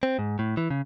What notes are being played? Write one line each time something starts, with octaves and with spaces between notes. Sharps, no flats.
C4
G#2
A2
E3
C#3